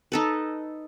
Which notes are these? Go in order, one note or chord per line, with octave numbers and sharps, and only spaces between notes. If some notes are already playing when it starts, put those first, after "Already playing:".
D#4 A4 B4